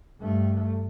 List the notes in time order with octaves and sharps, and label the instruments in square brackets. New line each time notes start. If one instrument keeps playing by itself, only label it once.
[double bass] G2 A3